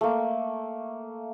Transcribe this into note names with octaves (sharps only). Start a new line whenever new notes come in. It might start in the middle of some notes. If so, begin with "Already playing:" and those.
A3 A#3